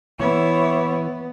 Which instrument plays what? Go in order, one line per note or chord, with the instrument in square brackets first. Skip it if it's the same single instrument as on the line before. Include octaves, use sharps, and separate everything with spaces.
[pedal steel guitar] E3 [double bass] B3 [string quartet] E4 C#5